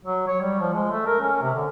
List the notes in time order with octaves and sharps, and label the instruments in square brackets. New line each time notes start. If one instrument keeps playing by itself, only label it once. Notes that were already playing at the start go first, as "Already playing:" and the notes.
[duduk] F#3
C#5
G3
F3
G#3
A3
A#4
C#4
C3
D3